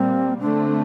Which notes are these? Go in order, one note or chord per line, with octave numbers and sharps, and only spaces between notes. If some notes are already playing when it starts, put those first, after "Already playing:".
Already playing: A#2 G3 A#3 C4
D3 A3 C4 D4